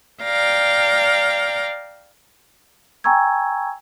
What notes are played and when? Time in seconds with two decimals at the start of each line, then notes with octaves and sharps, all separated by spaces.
0.24 D5 F5 G5 A#5
3.04 G5 G#5 A#5 C#6 E6 G#6